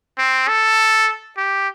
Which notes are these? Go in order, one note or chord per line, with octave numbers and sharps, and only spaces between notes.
C4
A4
G4